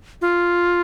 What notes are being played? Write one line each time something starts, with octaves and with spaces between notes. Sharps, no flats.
F4